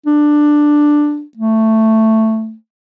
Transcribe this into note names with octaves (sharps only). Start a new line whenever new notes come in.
D4
A3